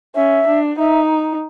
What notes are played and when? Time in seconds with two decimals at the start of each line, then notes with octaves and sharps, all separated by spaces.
0.15 C#4 E5
0.47 D4
0.78 D#4 E5